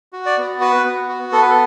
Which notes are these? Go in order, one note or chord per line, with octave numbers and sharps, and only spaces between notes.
F#4
D5
B3
F#4 B4
B3
F#4
B3 A4
B4
A4